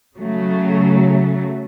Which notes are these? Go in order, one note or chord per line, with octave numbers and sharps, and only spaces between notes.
C#3 F#3 A3